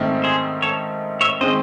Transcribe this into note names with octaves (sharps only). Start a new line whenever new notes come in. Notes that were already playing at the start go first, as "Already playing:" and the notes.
Already playing: G#2 D#3 A3 C4 D#4
G#4 C5
A4 C#5
C#5 E5
D#3 G#3 C4 C5 D#5